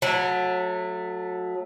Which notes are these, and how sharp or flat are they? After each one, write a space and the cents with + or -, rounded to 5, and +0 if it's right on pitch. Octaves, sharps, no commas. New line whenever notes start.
F#3 -25 A3 +0